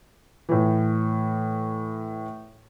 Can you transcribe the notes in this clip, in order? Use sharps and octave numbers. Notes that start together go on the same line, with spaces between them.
A2 E3